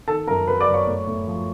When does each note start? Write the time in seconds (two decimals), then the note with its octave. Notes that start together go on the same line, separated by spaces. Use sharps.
0.08 D#3 A4 A5
0.27 F#2 A#4 A#5
0.47 F#3 B4 B5
0.60 D5 D6
0.67 F#2
0.74 C#5 C#6
0.87 A2
1.07 A2
1.27 F3